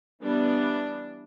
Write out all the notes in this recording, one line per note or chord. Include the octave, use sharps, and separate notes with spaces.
E3 G3 B3 D4